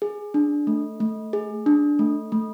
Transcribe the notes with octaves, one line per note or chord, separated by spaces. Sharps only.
G#4
D4
A3
A3
G#4
D4
A3
A3